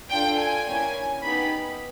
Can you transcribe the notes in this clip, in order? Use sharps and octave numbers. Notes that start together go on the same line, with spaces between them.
D4 F4 A4 G5
G#5
A#3 C#4 E4
B3 D#4 G4 B5